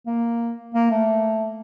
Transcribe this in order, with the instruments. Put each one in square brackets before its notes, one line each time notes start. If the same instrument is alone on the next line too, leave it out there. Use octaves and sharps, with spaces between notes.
[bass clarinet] A#3
A#3
A3